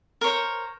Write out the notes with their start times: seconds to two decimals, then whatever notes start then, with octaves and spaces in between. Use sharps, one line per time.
0.21 A#4
0.24 C#5
0.27 C5